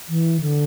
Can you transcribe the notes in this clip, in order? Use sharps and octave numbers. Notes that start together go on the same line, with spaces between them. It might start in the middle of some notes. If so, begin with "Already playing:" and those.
E3
D3